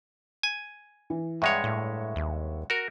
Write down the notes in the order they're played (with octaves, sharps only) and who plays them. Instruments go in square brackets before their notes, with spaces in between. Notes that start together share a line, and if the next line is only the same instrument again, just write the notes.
[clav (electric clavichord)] G#5
[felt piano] E3
[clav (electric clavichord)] G2 G#3 C#5 [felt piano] E5 F#5 C#6
[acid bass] A2
D#2
[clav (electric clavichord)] F#4 A#4